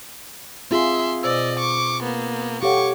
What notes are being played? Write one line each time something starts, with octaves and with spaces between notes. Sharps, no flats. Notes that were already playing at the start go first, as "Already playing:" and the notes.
C4 F4 G#4 E5 C6
B2 C5 D5 D#5 E6
C#6 D6
A#3 B3
G4 A4 C#5 F5 F#5 C#6 D6